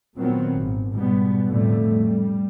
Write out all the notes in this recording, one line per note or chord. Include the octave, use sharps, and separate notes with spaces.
A#2 D#3 F#3 B3 C4
G#1
G#2 B2 G3 B3
F2 A2 D3 G3 A3
G3